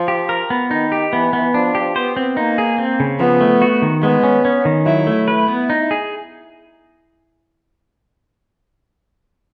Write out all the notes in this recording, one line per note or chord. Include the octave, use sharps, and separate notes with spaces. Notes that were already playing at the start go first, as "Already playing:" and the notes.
Already playing: F3
G4
A#4
B3
D#3 D#4
G4
E3 B3
B3
F3 D4
G4
B3 C5
C4
A#3 D#4
G#4
C4
C#3
F3 B3
A3
F#4
D#3
G#3 B3
C#4
C#4
D#3
F#3 E4
A3
E4 B4
B3
D#4
G#4